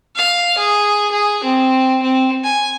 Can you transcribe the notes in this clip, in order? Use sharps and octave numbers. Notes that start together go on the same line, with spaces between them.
F5
G#4
G#4
C4
C4
G#5